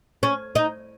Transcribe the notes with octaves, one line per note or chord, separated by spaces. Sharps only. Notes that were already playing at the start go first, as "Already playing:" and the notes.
C#4
D#4